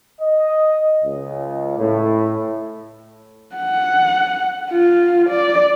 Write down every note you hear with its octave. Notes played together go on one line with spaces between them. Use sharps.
D#5
C#2
A2
F#5
F4
D5